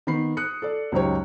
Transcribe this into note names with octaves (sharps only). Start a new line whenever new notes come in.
D#3 B3 B5 C7
D#6 F#6 C#7
A4 D5
C#2 F#2 D#4 G4 C#5